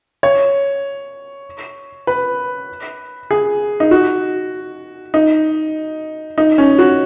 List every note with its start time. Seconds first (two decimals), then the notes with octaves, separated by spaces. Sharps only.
0.23 C#5
2.07 B4
3.31 G#4
3.80 D#4
3.91 F#4
5.14 D#4
6.38 D#4
6.58 C#4
6.79 F#4